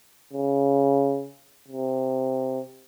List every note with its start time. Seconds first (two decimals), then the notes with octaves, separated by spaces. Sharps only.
0.33 C#3
1.68 C3